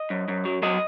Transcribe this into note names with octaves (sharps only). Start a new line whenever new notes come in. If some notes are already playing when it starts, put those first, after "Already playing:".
Already playing: D#5
F#2
F#2
F#3
F#3 D#5